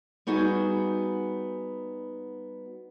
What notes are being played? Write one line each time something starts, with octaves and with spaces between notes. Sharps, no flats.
G3 B3 D#4 F#4 G#4